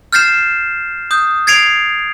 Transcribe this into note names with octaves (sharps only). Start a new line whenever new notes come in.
F6 G6 A6 C7 E7
D#6 G6
G#6 A6 C7 D7 F7